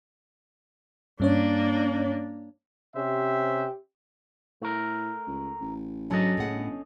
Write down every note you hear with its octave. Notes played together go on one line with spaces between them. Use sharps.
G2 A#3 C#4 D4 C#5
C3 C#4 G4 C5 E5
A2 A3 A#4
C#2
A1
G#2 F#3 C#4 D4 A4 D#5
F#1 A2 G#4 F#5
G1